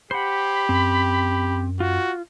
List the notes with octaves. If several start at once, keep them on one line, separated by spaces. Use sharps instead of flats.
G4 C5 F#5 B5
F#2 C4
F4 F#4